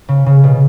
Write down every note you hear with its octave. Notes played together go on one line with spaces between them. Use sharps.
C#3
C#3
B2